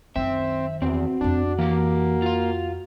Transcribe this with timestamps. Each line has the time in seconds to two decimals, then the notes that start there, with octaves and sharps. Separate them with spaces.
0.16 F#2 D#3 C4 E5
0.82 E2 C4 F#4
1.21 F2 A3 D4
1.59 E3 A#3 G4
2.22 F4 F5